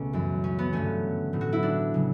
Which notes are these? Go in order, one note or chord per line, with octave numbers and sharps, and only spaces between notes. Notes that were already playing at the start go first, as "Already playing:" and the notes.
Already playing: C#2 B2 A3 B3 C#4
F#2 E3 G3
C#4
B3
G2 D3 F#3 A3 C#4
A2 F#3 A3
F#4
E4
D4
C#3 F#3